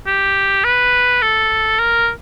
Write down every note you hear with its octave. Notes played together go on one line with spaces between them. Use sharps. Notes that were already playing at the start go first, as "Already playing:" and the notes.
G4
B4
A4
A#4